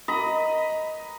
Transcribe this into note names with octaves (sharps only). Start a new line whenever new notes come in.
D#5 A#5 B5